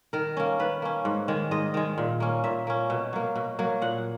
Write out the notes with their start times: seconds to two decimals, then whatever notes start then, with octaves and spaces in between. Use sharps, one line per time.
0.13 D#3 A#4
0.37 A#3 C#4
0.59 D#3 B4
0.82 A#3 C#4
1.05 G#2
1.28 D#3 G#3
1.51 G#2 D#5
1.74 D#3 G#3
1.98 A#2
2.20 A#3 C#4
2.44 A#2 E5
2.67 A#3 C#4
2.90 B2
3.13 F#3 A#3
3.36 B2
3.59 F#3 A#3
3.82 A#2 F#5